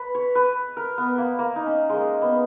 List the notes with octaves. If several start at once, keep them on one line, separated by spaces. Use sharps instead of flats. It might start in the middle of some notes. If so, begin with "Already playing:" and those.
Already playing: B4
C#5
B4
A#4
B3
A#3
A#3
D#4
C#4
G#3 A#3
B3